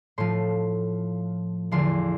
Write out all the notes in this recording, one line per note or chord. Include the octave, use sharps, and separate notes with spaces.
A2 F3 C6
E2 D3 F3 C6